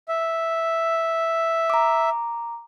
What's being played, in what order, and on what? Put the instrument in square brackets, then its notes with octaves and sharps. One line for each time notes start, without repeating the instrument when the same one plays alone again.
[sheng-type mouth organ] E5
[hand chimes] A#5 D6